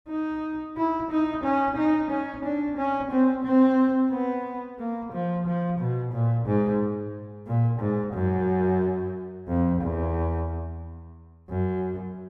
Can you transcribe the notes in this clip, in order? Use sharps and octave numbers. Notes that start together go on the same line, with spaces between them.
D#4
E4
D#4
C#4
D#4
C#4
D4
C#4
C4
C4
B3
A#3
F3
F3
B2
A#2
G#2
A#2
G#2
F#2
F2
E2
F#2